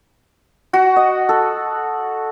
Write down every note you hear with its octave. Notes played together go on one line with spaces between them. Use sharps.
F#4
D#5
A4